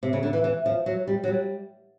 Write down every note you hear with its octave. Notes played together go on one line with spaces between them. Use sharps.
C3
C#3
D3
E3
E3
F3
F#3
G3
F#3
G3